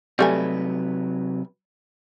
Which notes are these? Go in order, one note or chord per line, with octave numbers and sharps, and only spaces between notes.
C3 F#3 G3 A3 B4 G#5